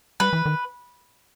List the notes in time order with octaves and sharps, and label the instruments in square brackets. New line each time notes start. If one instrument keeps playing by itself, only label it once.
[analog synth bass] G3 [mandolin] B4
[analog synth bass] E3
D#3